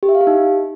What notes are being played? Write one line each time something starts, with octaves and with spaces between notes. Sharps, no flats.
G4
E5
F5
G4
D#4